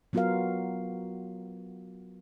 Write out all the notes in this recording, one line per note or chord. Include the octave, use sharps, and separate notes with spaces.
F#3 B3 F4 F#4 A#4 F5